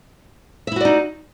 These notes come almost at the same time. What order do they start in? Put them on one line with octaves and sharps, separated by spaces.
E5 E4 F#4 D5 D#4